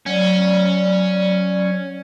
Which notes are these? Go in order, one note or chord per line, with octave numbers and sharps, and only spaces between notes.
F#3 C#4 D5